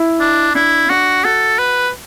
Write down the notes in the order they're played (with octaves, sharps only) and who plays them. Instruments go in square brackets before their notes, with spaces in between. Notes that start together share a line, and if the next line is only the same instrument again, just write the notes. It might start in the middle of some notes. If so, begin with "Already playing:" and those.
Already playing: [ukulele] E4
[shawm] D4
[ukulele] D4 [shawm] E4
[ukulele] D4 [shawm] F#4
[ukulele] F#4 [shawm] A4
[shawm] B4